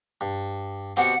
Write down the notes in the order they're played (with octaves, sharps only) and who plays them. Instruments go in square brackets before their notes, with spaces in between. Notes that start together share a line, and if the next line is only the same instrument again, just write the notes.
[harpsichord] G2
[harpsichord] B2 G3 C4 [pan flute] F#5